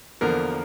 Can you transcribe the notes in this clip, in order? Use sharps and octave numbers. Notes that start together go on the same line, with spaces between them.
E2 D3 F3 A#3 A#4